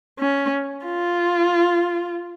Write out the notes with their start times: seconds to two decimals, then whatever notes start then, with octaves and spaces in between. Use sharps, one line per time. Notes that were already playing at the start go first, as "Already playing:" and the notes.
0.19 C#4
0.86 F4